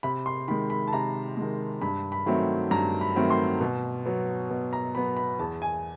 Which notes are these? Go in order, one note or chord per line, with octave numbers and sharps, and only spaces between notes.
C3 B5
C6
D#3 G#3 B5
B5
A5
C3 A#5
D#3 G#3
G2 B5
B5
D#3 F#3 A3 C4
G2 A#5
B5
D#3 F#3 A3 C4
C6
B2
F#3 B3
B2
A#5
F#3 B3 B5
B5
E2 A5
G#5